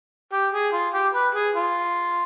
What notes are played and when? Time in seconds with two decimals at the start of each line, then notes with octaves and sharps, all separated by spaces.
0.33 G4
0.53 G#4
0.73 F4
0.94 G4
1.14 B4
1.35 G#4
1.55 F4